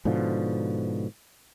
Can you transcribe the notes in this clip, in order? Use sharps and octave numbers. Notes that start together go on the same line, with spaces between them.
G#2 B2 D3 F3